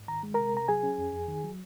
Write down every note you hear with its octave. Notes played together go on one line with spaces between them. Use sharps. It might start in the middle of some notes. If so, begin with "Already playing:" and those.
Already playing: G#2
D#3 A#5
G#3
C3 A#4 A#5
C3 A#5
F#3 G#4 G#5
C#4
F2
F2
D#3
F#3